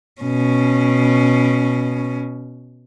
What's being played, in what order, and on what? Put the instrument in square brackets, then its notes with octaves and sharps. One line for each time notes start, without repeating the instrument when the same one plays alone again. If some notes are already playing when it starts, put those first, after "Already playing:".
[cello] B2 C#4